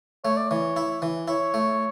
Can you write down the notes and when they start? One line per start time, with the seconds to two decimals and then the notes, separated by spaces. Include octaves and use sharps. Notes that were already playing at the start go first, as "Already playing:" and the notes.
0.24 A3 C#5
0.37 D5
0.49 E3 C#5
0.76 E4
1.02 E3
1.28 E4 C#5
1.54 A3